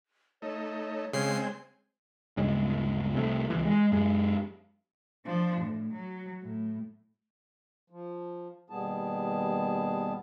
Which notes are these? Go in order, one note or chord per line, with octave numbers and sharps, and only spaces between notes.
A3 D#4 C#5
C#3 G#3 C4 C7
G1 D2 C#3 G#3
C2 C3 E3 A3
C#2 E3
G#3
F#2 G#3
F3 D4
A2
F#3
A2
F3
D#2 B2 G3 B3 G#4 A5